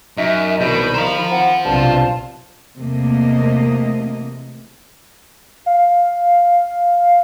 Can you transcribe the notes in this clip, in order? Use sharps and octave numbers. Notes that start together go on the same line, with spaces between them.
F#2 D#4 E5
C2 B2 D#3 B5 G6
C5 F5 A#5
C4 F#5
B1 G2 C3 F4 A5
E2 C3 A3 A#3 D#5
F5